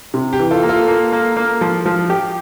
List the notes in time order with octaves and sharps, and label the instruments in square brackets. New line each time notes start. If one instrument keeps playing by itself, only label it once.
[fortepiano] C3
[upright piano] G4
[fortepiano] E3
[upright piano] F4 A4
[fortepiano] A#3
[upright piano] F4 A4
[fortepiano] A#3
A#3
A#3
F3
F3
G4